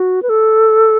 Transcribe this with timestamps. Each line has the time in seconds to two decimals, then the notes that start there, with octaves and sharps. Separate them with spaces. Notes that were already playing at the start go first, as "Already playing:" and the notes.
Already playing: F#4
0.22 B4
0.29 A4